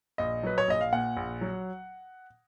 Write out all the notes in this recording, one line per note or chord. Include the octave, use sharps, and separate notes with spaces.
A#1 D#5
F#3 B4
C#5
A#1 D#5
F5
A#2 F#5
A#1
F#3